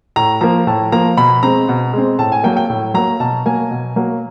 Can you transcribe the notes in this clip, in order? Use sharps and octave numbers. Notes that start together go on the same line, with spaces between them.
A2 A#5
F3 A#3 A#5
A2 A5
F3 A#3 A#5
B2 B5
G#3 C4 A#5
B2
G#3 C4
A2 A5
G#5
F#3 A#3 G5
G5
A2
F#3 A#3 A#5
B2 A5
F#3 A#3 G#5
B2
F#3 A#3